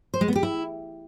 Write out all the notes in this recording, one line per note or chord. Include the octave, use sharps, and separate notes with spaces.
C5
G#3
B3
G4
E4